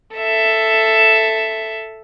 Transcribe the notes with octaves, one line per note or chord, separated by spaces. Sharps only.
A4 E5